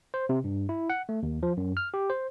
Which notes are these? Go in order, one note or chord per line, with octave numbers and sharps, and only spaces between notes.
C5
C3
G2
E4
F#5
A3
D#2
F3
F#2
F6
G4
C5